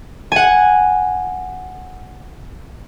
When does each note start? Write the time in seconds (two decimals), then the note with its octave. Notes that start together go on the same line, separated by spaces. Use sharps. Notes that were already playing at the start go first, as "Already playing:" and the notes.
0.32 F#5 G#5